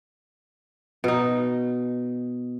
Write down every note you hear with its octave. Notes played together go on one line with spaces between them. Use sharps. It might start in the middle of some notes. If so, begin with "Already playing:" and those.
B2 D#4